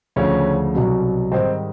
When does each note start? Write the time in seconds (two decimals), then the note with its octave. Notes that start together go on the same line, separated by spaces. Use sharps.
0.16 D2 C#3 F3 C#4
0.75 C2 B2 F#3
1.32 G#2 D#3 G3 C4